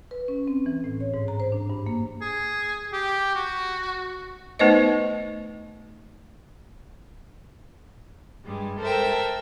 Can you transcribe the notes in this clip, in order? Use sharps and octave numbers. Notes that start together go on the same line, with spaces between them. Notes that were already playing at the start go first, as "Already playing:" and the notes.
B4
C#4
C4
E3
A2
C#5
G#2
A#5
C5
D4
G2
A#3
G#4
G4
F#4
A3 B3 D#4 B4 C5 D#5
G2 G3 G#3
A4 A#4 C5 E5 G5